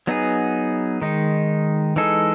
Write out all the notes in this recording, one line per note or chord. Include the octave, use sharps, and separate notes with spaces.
F#3 B3 D#4 G#4
D#3 G#3 D#4
E3 G#3 D#4 A4